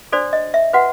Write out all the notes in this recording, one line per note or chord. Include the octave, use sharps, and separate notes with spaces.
D4 F#4 A4 C5 D5
D#5
E5
F#4 B4 F#5